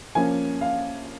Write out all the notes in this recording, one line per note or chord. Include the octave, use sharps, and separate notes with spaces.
F3 A#3 C#4 G#5
F5